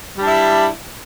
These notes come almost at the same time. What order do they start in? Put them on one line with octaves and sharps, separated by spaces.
G3 D4 E4